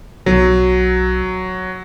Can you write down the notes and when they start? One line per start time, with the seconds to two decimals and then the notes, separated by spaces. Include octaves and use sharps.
0.26 B1 F#3